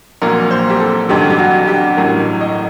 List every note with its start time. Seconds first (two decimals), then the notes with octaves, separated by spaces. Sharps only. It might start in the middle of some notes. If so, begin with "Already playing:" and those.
0.22 A#1 A#2 F#3 A#4
0.51 C5
0.70 G4
0.80 A4
1.09 A1 G2 D3 F#3 G4
1.30 G4
1.39 F#4
1.67 G4
1.97 A1 A2 F#3 A#4
2.41 D#5